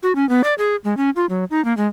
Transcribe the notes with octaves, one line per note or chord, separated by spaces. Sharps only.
F#4
C#4
B3
D5
G#4
G#3
C#4
F4
F#3
D#4
A#3
G#3